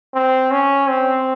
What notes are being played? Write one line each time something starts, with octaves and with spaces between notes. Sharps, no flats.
C4
C#4
C4